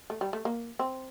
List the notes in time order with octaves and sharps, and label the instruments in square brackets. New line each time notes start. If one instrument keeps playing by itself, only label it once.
[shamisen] A3
G3
A3
A#3
C4